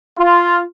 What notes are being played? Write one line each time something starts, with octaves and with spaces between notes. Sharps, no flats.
F4